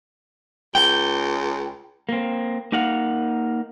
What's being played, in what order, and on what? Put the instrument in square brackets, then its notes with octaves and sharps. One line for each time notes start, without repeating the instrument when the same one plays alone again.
[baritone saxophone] C#2 [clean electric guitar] G5
[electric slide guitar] A#3 C4
A#3 D#4 A#4 F5 F#5